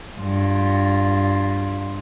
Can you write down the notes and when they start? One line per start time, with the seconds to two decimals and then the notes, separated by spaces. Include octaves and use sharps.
0.19 G2 F4